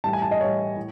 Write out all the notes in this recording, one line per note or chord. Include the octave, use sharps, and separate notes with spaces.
A2 E3 G3 A5
G#5
A5
D#5
A2 E3 G3 C#5
A2